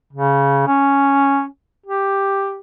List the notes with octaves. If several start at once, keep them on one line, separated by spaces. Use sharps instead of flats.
C#3
C#4
G4